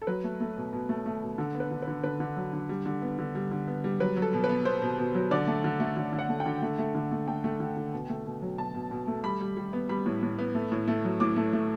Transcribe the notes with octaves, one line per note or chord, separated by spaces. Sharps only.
A4
F#3 B4
A3
A3
B2
B2
A3
A3
B2
D3 A4
B3
B4
D3
B4
D3
D3 B4
D3
F#3
D3
G3
D3
B3
D3
G3
D3
B3
G3
F#3 B4
F#3
A4
B2
B4
B3
B3 C5
B2
B2
F#3
D3 D5
A3
D3
A3
D3
D3
F#5
A3
G5
D3
A3
A3
D3
A3
A3 G5
A3
D3
D3
B2
A3
B2
F#3
B2 A5
B2
B2
A3
G3 B5
G3
G3
B3
G3 B5
A2
A2
B3
A3
A2
A3
F#3
A2 D6
A3
A3